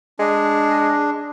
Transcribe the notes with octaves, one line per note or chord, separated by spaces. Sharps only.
G#3 D4